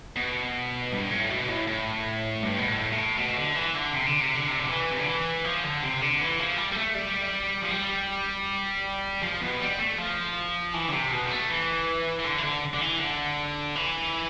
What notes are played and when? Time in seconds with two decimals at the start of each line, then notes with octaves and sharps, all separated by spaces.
0.16 B2
0.92 G2
1.11 A2
1.30 B2
1.48 A2
1.67 A2
2.43 G2
2.58 B2
2.68 A2
2.93 A2
3.18 B2
3.37 D3
3.56 E3
3.75 D3
3.93 C3
4.06 D3
4.21 C3
4.35 D3
4.48 C3
4.59 D3
4.69 E3
4.91 C3
4.99 D3
5.07 E3
5.44 F3
5.63 D3
5.82 C3
6.01 D3
6.20 E3
6.39 F3
6.58 G3
6.72 G3
6.77 A3
6.95 G3
7.62 F3
7.71 G3
9.22 F3
9.41 B2
9.60 G3
9.79 A3
9.98 F3
10.74 E3
10.88 D3
10.92 C3
11.11 B2
11.25 G3
11.31 A3
11.49 E3
12.19 E3
12.24 D3
12.38 E3
12.43 D3
12.74 D3
12.81 E3
13.00 D3
13.75 E3